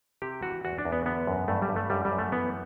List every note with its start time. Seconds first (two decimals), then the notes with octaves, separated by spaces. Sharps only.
0.22 C3 G4
0.43 E3 F#4
0.65 E2 F#4
0.78 D4
0.85 E2
0.92 B3
1.06 D3 B3
1.27 F#2
1.48 G2 A3
1.62 G3
1.69 G2
1.76 A3
1.90 F#2 G3
2.05 G3
2.12 F#2
2.19 A3
2.32 E3 B3